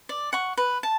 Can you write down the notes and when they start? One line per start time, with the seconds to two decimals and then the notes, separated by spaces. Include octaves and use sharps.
0.09 D5
0.33 F#5 C#6
0.57 B4
0.83 A5